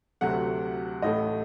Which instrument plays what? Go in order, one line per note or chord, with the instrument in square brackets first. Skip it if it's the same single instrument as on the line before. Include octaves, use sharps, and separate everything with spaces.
[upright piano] D2 C3 F#3 A3 F#5
A1 A2 A3 D#5